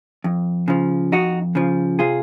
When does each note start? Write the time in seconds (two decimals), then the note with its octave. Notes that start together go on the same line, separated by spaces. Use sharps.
0.24 F2
0.68 C#3 F3
1.12 F2 D#4 F#4
1.55 C#3 F3
1.99 C3 F4 G#4